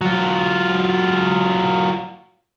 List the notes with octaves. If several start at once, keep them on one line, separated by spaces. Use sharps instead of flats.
F#3 F4